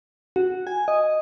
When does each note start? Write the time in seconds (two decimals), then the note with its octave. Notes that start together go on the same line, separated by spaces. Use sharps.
0.36 F#4
0.67 G#5
0.88 D#5